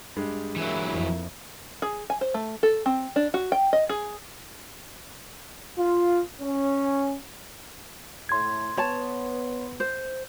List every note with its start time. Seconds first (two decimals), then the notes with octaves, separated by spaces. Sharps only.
0.16 G2 G3 G#3
0.56 E3 F#3 A#3 E4
0.90 F2
1.82 G#4
2.10 G#5
2.21 C5
2.34 A3
2.63 A4
2.86 C4
3.16 D4
3.34 F#4
3.52 G5
3.73 D#5
3.89 G#4
5.79 F4
6.42 C#4
8.29 A2 C6 G#6
8.77 B3 C#5 A5
9.80 C5